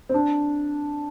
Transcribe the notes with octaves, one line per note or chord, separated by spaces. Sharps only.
C4
D4